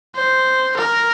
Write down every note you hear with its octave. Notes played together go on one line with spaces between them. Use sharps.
C5
A#4